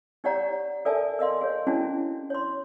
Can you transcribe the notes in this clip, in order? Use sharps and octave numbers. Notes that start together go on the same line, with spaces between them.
D#4 G4 C#5 D5 F#5 A#5
A4 A#4 D5 E5 G#5 A5
A#4 D#5 F5 C6
G#4 C#5
C#4 D4 E4 F#4 G#4 A5
C#5 C6